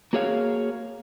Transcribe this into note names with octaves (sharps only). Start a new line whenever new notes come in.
A#3 F#4 G#4 C#5 E5 F5